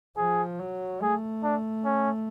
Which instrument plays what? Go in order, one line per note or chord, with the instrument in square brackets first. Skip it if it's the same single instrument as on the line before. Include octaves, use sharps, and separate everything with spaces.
[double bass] F3 [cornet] G#4
[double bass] F#3
[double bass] A3 [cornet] G#4
[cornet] D4
C#4